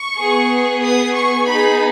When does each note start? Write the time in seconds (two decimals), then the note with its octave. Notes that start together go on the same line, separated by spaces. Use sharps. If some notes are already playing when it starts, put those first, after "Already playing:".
Already playing: C#6
0.19 B3 G#4
0.84 D#6
1.16 C#6
1.48 B3 D#4 G#4 B5